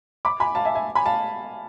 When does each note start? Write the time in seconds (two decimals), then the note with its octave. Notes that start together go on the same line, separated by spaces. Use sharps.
0.25 B5 D6
0.40 G#5 B5
0.55 F5 A5
0.65 E5 G#5
0.75 E5 G#5
0.95 G#5 B5
1.06 F5 A5